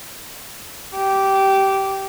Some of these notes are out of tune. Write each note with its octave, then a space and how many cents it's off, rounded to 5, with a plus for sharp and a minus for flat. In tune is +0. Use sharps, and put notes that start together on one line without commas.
G4 -15